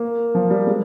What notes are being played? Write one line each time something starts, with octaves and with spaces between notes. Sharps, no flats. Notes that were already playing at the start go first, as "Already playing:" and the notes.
Already playing: A#3
F3
G3
G#3